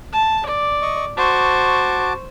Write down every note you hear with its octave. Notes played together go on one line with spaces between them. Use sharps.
A5
D5
D#5 C#6
F#4 C5 A5 C#6 D6